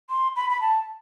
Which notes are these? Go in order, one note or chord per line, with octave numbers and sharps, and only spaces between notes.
C6
B5
B5
A5